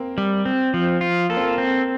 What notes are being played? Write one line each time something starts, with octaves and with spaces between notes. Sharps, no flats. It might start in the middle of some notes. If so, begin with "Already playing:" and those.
Already playing: A#3 C4
G3
C4
F3
F4
A#3 A4
C4
A#3
C4